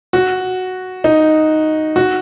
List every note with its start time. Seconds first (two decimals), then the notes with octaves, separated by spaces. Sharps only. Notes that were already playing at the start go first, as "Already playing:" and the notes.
0.13 F#4
1.04 D#4
1.96 F#4